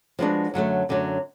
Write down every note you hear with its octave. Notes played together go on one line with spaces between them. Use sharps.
F3 G#3 B3 D4 F#4
F#2 D3 F#3 A3
F#2 D3 F#3 A3